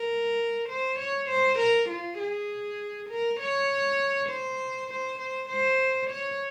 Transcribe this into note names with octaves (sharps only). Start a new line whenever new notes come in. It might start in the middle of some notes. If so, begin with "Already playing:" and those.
Already playing: A#4
C5
C#5
C5
A#4
F4
G#4
A#4
C#5
C5
C5
C5
C5
C#5